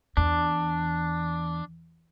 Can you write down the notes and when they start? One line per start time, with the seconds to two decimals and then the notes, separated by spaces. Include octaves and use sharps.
0.17 E2 D4